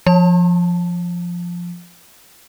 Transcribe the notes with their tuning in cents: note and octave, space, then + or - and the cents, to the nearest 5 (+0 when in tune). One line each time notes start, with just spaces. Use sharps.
F3 +0 A5 +0